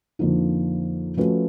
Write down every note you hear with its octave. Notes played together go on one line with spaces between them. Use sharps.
F2 D3 F3 A#3 D#4
F3 A3 C#4 F#4 B4